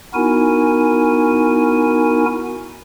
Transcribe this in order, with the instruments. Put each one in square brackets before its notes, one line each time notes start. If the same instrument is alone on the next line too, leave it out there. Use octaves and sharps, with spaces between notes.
[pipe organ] B3 D#4 E4 F#4 A#4 G#5